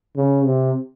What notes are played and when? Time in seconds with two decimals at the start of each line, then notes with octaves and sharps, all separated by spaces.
0.16 C#3
0.45 C3